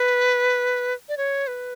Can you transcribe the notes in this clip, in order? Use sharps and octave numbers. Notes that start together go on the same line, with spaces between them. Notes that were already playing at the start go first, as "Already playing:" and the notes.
Already playing: B4
D5
C#5
B4